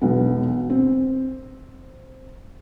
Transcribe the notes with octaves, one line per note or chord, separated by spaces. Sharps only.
E1 B1 B3
C4